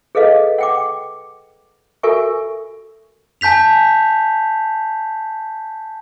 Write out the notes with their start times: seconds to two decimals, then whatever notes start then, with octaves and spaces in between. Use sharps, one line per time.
0.15 G#4 A4 B4 D#5 F5
0.58 F#5 G5 D6
2.03 F#4 A4 A#4 E5 G#5 C#6
3.41 G#5 A5 G6 B6 F7